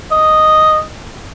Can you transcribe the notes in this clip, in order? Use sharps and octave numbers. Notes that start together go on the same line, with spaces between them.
D#5